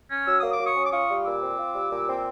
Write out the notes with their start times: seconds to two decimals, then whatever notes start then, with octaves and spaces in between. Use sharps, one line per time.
0.09 C#4
0.26 F#3 E6
0.39 A#3 D#6
0.52 D6
0.59 F#3
0.66 C#6 D#6
0.75 C#4
0.85 D6
0.92 F4 C#6 D#6
1.09 G3
1.25 A#2 D6 E6
1.42 C4
1.58 F4
1.74 G3
1.91 A#2
2.08 C4